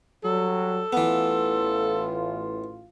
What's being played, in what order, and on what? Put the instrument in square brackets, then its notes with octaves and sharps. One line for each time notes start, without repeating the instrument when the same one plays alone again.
[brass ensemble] F#3 G3 [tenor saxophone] A4
[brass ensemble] A1 A2 F4 [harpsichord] E3 B3